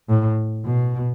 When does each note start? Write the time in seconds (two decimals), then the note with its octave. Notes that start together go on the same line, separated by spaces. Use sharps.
0.09 A2
0.65 B2